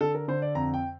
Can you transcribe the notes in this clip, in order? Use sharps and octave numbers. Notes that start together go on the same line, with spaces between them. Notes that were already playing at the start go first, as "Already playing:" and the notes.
D3 A4
A#4
D3 C5
D5
F2 A#5
G5